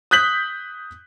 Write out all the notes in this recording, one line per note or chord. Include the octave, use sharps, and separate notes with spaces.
D#6 F#6 G6 B6 F#7